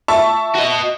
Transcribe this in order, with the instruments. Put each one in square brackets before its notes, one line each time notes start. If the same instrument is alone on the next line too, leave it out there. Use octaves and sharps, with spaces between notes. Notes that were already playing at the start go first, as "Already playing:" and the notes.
[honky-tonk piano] E5 A5 C#6
[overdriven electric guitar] F#4 D#5